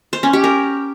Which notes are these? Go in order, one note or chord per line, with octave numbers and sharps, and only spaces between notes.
C5
C#4
G4
A#4